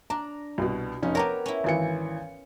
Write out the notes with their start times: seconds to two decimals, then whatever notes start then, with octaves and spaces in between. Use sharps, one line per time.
0.10 D4 A#5
0.58 C2 B2
1.02 F1 C#4 D#4
1.15 B3 G4 A#4 C#5 A#5
1.46 C#4 E4
1.64 G#1 E3 C#7